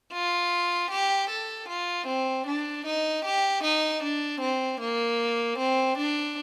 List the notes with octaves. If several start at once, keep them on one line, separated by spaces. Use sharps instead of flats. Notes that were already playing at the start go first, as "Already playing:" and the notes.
F4
G4
A4
F4
C4
D4
D#4
G4
D#4
D4
C4
A#3
C4
D4